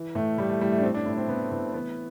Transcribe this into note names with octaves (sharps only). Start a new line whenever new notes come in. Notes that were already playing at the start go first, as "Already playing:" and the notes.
Already playing: E3
A2 A3
A2 G3
A3
A2 G3
A3
D4
A2 C4
D4
A2 E4
D4
C4
A2 B3
A3
A2 B3
E3 B3